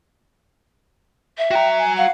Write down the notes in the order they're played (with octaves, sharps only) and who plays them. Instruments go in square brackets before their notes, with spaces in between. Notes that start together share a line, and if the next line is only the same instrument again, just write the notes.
[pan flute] E5
[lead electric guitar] F#4 A#5 [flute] G5
[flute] G#5
[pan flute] F5 [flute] F#5